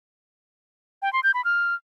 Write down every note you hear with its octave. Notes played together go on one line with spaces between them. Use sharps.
G5
C6
G6
B5
F6